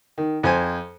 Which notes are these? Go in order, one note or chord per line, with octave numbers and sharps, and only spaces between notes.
D#3
F2 C5 G#5